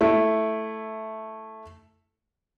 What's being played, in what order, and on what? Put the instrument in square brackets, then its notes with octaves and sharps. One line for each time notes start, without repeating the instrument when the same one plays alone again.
[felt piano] A3 E4